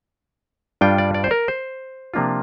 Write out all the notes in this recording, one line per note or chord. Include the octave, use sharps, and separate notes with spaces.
G2 G3 D4 F4 G5
D5
D5
C5
A#4
C5
C3 F3 A#3 D4 F4